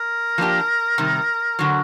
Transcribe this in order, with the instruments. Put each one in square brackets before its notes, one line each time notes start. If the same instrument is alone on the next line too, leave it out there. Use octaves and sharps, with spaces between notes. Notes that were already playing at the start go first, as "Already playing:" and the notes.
Already playing: [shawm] A#4
[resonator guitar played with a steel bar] F3 A#3 D4 G4
C3 D#3 G3
D3 F#3